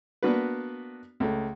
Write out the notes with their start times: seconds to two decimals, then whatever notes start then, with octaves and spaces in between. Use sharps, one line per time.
0.23 A#3 B3 D4 F#4 B4
1.20 C#2 A3